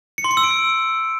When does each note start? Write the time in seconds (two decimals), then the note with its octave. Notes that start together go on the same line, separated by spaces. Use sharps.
0.18 C#7
0.24 C6
0.31 C#7
0.37 E6
0.43 D7